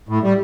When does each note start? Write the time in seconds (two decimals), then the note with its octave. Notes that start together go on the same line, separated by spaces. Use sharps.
0.09 A2
0.23 G3